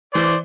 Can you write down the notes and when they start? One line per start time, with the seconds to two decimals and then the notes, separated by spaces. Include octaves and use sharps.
0.14 E3 C5 D5